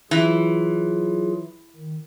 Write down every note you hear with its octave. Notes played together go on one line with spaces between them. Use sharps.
E3 F#3 F4 G#4
D#3